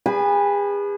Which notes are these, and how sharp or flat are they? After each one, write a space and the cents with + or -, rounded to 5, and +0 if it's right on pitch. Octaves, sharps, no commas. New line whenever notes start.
G#4 -40 B4 -10 G#5 +40